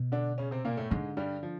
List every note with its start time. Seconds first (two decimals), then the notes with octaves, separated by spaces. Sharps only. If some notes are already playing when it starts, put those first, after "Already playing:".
Already playing: B2
0.12 D3 D4
0.38 C#3 C#4
0.51 C3 C4
0.65 A#2 A#3
0.77 A2 A3
0.91 G#2 D3 G#3
1.17 G2 G3
1.43 F3